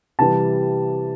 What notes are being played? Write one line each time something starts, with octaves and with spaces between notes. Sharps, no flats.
C3 E3 G3 A5